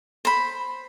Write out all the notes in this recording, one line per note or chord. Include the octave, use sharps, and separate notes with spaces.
C5 B5